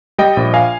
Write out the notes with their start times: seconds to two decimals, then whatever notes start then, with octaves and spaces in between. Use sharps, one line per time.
0.18 G3 D#5 G5
0.37 A#1
0.54 F5 G#5